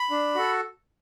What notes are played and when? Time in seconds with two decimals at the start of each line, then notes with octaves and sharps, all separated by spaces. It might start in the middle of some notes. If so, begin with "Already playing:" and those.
Already playing: B5
0.10 D4
0.35 F#4 A4